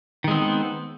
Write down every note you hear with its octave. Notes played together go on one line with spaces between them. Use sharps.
D#3 G#3 B3 C4